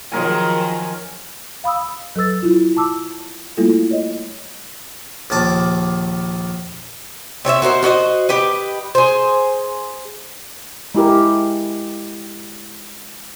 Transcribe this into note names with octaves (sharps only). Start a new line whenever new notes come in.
D#3 F3 F#3 G#4 A#4 G#5
F5 B5 D#6 E6
F#3 A4 B4 E6 A6
F#3 E4 F4
A5 D6 E6
G3 A3 A#3 E4 F4 A4
C#5 D#5
A#1 D#2 A5 D6
C4 C#5 D5 E5
F#4 A#4 C5 D#5
D4 F#4 C5 D#5
G4 B4 D#5
G#4 C5
G#3 E4 G4 A#4